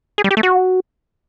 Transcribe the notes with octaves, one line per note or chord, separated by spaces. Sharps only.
G#4
G3
G4
A3
F#4